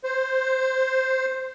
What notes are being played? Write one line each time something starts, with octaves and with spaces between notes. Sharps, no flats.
C5